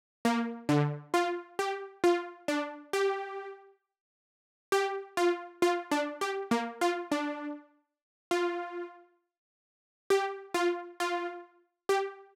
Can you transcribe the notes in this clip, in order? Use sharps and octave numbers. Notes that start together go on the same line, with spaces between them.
A#3
D3
F4
G4
F4
D4
G4
G4
F4
F4
D4
G4
A#3
F4
D4
F4
G4
F4
F4
G4